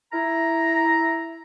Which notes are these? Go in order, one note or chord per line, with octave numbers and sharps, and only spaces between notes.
E4 A#5